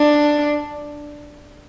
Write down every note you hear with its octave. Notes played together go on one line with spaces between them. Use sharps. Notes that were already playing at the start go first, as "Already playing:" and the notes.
Already playing: D4